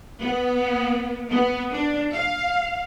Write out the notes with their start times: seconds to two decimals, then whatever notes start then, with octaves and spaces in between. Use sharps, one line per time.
0.20 B3
1.30 B3
1.72 D4
2.13 F5